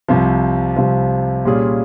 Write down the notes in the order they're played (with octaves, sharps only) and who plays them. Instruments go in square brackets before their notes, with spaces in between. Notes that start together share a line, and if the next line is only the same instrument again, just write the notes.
[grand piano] C2 C3 F3
C2 C3 F3
A#2 G3 C#4 F4 G#4